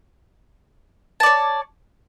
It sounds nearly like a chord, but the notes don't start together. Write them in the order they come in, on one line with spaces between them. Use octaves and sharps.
A5 D5 C#5